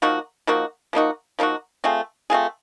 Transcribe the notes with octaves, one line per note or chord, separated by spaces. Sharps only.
F3 A#3 D#4 F#4
F3 A#3 D#4 F#4
F3 A#3 D#4 F#4
F3 A#3 D#4 F#4
A3 C4 F4 G#4
A3 C4 F4 G#4